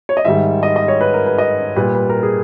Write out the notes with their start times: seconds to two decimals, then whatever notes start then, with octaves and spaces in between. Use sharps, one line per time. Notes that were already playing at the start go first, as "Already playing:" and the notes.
0.09 C#5
0.17 D#5
0.25 G#2 D#3 G3 E5
0.63 D#5
0.76 D#5
0.88 C#5
1.01 B4
1.14 A#4
1.26 B4
1.38 D#5
1.76 A#2 G3 B4
1.95 B4
2.10 A#4
2.23 G#4